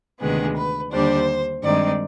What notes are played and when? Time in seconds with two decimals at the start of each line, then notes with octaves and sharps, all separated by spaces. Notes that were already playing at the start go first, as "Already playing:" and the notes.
0.21 D2 C3 D#3 G#3 B3 G#4
0.57 B4
0.92 D#2 D3 G3 D4 C5
1.63 G2 D#3 G#3 C4 D#4 D5